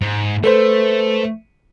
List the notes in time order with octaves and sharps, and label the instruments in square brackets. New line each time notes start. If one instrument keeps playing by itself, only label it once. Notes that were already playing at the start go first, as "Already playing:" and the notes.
[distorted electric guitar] G#2
[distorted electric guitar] A3 [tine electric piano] A4 B4 C5